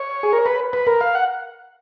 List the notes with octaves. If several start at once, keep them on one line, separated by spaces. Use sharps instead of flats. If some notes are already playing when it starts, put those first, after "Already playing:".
Already playing: C#5
G#4
A#4
B4
B4
A#4
F5
F#5